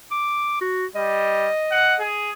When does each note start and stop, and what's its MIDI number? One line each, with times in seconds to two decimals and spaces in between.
0.11 0.60 86
0.61 0.86 66
0.95 1.49 55
0.95 2.06 75
1.71 1.94 78
2.00 2.32 68